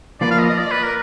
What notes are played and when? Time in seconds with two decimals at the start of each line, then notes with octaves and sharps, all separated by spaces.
0.21 F3 A#3 F4 B4 D5
0.31 F5
0.39 D#5
0.49 D#5
0.58 D5
0.71 B4
0.83 A#4